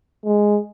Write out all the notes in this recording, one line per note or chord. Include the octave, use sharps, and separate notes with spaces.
G#3